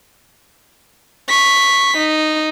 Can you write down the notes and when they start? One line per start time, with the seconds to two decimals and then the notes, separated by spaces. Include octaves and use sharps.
1.29 C#6 B6
1.97 D#4